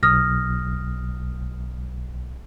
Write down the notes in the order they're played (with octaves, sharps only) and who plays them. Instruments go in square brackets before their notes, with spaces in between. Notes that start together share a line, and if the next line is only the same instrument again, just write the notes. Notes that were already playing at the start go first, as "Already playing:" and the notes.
[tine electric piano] B1 [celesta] D#6 F6 A#6